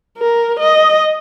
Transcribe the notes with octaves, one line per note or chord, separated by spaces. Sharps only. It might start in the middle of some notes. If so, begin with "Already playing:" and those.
A#4
D#5